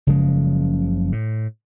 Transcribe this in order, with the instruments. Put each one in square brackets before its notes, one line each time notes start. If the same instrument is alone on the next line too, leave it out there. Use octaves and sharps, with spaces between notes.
[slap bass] F#1 C#3 F3 G#3
A2